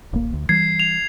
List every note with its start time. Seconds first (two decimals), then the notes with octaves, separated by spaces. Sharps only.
0.13 D1 A1 A#3
0.33 D2
0.49 E3 G3 G#6 C7
0.80 F7